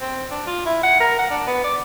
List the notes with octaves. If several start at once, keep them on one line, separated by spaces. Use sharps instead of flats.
C4
D4
F4
E4
F#5
A#4
F#5
D4
B3
D5